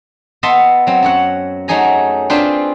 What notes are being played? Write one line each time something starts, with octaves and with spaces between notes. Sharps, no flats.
B3 D#5 E5 A5 C6
F#3 C4
F#2 C#5 F#5
F#3 A3 D#4 G#4 G#5 A#5
C4 D4 F4 G#4 B4 C5